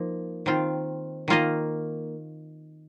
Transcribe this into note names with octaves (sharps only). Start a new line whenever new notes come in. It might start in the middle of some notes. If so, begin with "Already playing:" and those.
Already playing: F3 A#3 D#4
D#3 C4 F4
D#3 A#3 F4 D#5